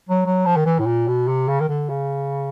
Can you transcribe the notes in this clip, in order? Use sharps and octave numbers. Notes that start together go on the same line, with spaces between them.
F#3
F#3
F3
D#3
E3
A2
A#2
B2
C3
C#3
D#3
D3
C#3